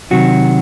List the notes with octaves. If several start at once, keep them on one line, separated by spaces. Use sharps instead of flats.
C3 D#3 F#3 F#4